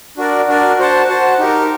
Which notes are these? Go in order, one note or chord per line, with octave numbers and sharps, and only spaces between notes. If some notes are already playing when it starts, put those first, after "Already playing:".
D4 F#4 A#4 D5
D4 F#4 A#4 D5
F#4 C5 F#5 A5
F#4 C5 F#5 A5
D#4 G4 A#4